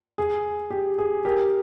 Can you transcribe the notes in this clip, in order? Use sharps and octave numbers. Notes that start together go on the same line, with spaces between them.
G#4
G4
G#4
G4 A#4